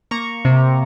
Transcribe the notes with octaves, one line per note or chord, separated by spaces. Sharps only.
A#3 A#5 C#6
C3